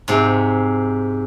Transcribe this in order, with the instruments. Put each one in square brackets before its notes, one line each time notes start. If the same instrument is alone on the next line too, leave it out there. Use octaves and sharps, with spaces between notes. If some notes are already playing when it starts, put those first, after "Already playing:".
[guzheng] G#2 C3